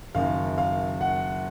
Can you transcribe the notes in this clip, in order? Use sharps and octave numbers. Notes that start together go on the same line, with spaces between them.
F#1 F#2 D#3 F5
F5
F#5